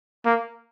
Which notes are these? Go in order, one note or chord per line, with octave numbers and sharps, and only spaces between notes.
A#3